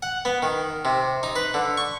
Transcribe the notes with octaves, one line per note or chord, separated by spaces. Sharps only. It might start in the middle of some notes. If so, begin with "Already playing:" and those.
F#5
B3
D#3
C3
D#4
B4
D3
C#6